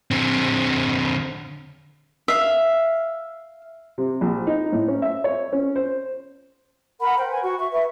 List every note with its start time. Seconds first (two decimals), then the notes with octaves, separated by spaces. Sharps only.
0.11 D3 C4
2.28 E5 F5
3.98 C3
4.21 A#1
4.47 D#4
4.72 A2
4.88 C#4
5.02 E5
5.24 C#5
5.53 C#4
5.76 C5
7.01 A#4 F#5 B5
7.19 C5 G5
7.31 B4 G#5
7.43 F#4 C#6
7.58 E5 C#6
7.71 B4 E5